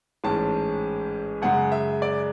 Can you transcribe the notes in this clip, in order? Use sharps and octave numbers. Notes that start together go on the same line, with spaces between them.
A1 G#2 G#3 C#4 A5
F#2 C#3 G#3 F#5
E5
D5